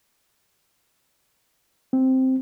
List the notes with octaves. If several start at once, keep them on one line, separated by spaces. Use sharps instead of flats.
C4